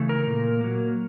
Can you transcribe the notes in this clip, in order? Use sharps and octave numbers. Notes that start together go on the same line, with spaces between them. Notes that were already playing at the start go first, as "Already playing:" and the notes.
Already playing: C#3 E3 A3
A#4
A#2
F#3 A#3